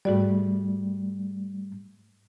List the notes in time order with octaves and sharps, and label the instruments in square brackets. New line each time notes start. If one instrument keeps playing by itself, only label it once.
[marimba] G#2 F#4 D5 [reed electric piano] G3 A3